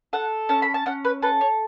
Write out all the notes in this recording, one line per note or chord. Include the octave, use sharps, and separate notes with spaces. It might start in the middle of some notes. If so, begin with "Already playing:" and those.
A4 F#5
C#4 A5
B5
A5
C#4 F#5
B4
A4 B4
C#5